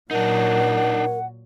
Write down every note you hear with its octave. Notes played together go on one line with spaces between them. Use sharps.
A#2 F#3 D4 D#4 A#4 F#5